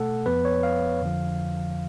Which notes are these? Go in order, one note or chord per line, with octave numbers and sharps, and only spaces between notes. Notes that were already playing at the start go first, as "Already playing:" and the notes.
Already playing: B2 A3 A4 F#5
F2 F3 B3 B4
C#5
F5
F2 D3 F3